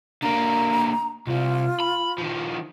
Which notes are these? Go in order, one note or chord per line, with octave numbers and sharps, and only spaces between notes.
D3 A#3 A#5
C2 C3 F4
B5
D#3 F3